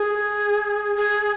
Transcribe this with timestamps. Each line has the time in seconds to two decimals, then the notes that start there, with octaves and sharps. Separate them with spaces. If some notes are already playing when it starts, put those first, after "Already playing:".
Already playing: G#4
0.96 G#4